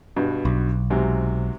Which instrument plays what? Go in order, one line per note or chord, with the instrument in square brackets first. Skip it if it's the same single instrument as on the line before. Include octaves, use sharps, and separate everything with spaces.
[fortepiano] G2 B2
[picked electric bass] B1
[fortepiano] G#2 C3 F#3